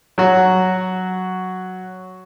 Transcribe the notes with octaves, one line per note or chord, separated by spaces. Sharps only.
F#3 F#4